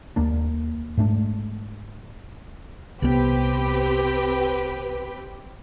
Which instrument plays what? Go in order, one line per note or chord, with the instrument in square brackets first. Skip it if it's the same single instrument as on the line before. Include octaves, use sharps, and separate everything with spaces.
[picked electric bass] D#2 A#3 D4
G#2 A3 D4
[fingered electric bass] C2 B3 [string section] C4 G4 B4